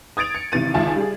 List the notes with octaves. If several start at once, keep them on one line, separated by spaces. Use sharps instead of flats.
D#6 G#6 A6 D7 F7
C#7
G#1 C3 E3 A6 D#7
G#1 C#2 F4 E5 G#5 A5
G3 G#4